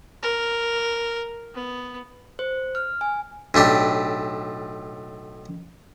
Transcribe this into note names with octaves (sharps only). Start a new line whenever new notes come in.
A#4
B3
C5
F6
G#5
B1 A2 D4 G4